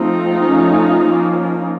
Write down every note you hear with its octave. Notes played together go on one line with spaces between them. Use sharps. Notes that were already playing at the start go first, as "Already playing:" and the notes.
Already playing: F3 A3 C4 D#4 F4
F3 A3 C#4
F3 A#3 C#4